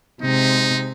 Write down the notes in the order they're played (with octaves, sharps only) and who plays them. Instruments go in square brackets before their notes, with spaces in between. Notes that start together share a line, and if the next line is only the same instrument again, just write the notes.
[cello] C3 G#3 [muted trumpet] D#4